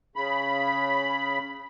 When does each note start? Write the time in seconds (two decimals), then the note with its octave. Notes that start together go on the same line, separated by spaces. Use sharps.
0.16 C#3 B5